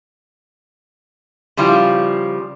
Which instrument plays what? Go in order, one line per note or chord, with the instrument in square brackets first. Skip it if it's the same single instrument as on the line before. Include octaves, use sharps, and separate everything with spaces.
[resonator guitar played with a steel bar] C#3 F3 G3 E4 F4